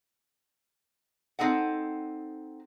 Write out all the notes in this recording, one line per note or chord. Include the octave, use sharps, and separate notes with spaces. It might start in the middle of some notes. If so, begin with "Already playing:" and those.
C4 D#4 A4 F#5